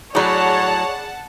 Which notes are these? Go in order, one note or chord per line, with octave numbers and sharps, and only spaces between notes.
A2 F#3 G#4 C#5 D5 F#5 A5 B5